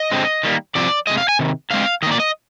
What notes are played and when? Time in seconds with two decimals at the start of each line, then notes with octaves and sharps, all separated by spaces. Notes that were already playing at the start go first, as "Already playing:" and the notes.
Already playing: D#5
0.12 D3 G#3 C4
0.43 D#3 G3 A#3
0.75 C3 F3 C4 D5
1.07 C3 D#3 G#3 D#5
1.18 F5
1.29 G#5
1.39 C3 D#3
1.70 D3 G#3 C4 F5
2.02 D#3 D#5
2.07 A#3 D5
2.20 D#5